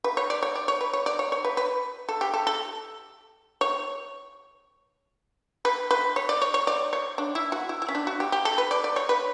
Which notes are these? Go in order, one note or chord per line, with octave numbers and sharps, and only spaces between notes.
B4
C#5
D5
C#5
D5
C#5
B4
C#5
D5
C#5
C#5
B4
B4
A4
G4
A4
A4
C#5
B4
B4
C#5
D5
C#5
C#5
D5
C#5
D4
E4
F#4
E4
E4
C#4
D4
F#4
G4
G4
A4
B4
D5
D5
C#5
B4